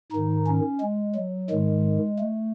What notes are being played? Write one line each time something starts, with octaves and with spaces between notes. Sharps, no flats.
G#2 D#3 D#4
C#4
G#3
F#3
G#2 D#3 G#3
A3